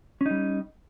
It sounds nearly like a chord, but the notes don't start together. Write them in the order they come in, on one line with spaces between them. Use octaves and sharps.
C#4 D#4 G3